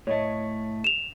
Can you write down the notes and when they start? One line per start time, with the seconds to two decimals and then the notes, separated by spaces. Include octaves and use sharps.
0.07 A2 A3 C#5 D#5
0.84 E7 F7